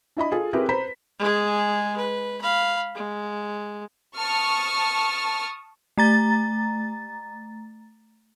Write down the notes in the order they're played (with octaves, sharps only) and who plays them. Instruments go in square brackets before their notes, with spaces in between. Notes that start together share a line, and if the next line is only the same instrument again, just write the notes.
[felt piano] D4 E4 D#5 B5
F4 G#4 A4
C4 E4 G4 G#4 A#4 B4
B4 C5 A#5 B5 B6
[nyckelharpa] G#3 G#4
B4
F5 B5
G#3
[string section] A5 C#6 D#6 F6
[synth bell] A3 A#5 A6